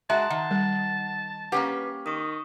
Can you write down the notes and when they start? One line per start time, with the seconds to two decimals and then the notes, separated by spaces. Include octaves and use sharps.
0.10 G#3 F#4 E5 A5 A#5 C6
0.30 D#3 F#5
0.51 G3
1.52 A#3 C#4 G4 B4 F#5 B6
2.06 D#3 C#6 D#6